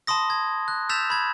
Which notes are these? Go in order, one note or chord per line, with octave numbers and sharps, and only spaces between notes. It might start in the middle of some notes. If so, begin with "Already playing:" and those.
A5 B5 C6 D#6 A#6
G#6
F#6
E6 G6 A6 B6 E7 F7
B5 G#6